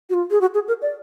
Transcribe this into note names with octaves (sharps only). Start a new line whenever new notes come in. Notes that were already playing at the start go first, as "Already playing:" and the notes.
F#4
F4
G#4
F#4
G#4
A#4
D5